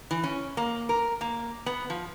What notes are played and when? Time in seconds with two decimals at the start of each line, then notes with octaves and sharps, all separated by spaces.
0.11 E3
0.24 C#4
0.57 A#3
0.89 A#4
1.21 A#3
1.66 B3
1.90 F3